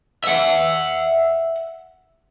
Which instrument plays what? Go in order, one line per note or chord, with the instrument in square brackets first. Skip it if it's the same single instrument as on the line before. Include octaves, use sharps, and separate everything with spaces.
[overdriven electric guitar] E5 F#5